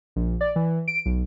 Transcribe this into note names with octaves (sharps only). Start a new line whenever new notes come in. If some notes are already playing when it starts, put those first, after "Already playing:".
A#1
D5
E3
D7
B1